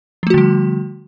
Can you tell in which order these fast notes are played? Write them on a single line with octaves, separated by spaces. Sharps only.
F3 A3 F#4 D3 G3